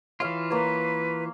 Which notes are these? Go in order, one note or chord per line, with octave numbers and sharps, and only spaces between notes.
E3 F4 C#5 F5
A#3 B4 C#5